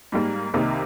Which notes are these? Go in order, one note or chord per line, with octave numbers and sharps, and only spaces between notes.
G#2 G3 A#3
C2 C3 D#3 A#3 D#4